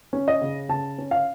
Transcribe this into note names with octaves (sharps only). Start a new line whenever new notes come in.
C#4
D#5
C#3
C#3 A5
C#4
F5